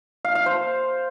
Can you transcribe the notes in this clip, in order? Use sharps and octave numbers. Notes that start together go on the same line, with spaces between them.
F5
F5
C5